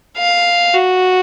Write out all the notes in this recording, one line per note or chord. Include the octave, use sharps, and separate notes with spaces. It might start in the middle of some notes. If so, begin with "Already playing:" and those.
F5
F#4